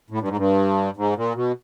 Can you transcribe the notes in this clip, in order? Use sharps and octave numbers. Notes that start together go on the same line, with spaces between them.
A2
G2
G#2
G2
G#2
A#2
B2